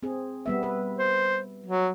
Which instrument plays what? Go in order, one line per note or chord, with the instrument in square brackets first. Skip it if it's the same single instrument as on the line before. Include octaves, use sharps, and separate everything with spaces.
[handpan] C4 G#4
G3 B3 E5
B4
[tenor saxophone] C5
F#3